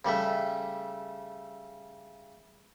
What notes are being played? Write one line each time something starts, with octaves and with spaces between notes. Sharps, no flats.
C#3 G3 A3 E5